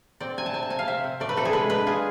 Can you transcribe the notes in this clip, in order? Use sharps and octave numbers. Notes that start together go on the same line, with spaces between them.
C4 D5
C3 G#5
A5
C3 G#5
A5
C3 G#5
F5
C3 E5
C3
A3 D5
B4
C3 A4
G#4
G#3 B4
D4 B4
F4 G#4